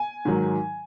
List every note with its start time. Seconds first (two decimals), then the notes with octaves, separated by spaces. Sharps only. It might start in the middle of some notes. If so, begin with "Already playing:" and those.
Already playing: G#5
0.25 G#2 D#3 F#3